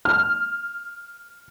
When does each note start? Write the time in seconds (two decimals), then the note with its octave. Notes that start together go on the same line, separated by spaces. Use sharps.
0.05 F6